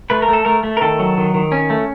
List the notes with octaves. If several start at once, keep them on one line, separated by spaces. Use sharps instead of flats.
A3 B4
A#4
A3 A4
A3 A#4
A3
A#4
D#3 A4
F#3
D#3
D#3
C#4
A3